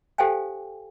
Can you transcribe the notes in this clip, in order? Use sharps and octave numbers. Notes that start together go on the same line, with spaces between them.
G4 A4 C5 F5 G5 G#5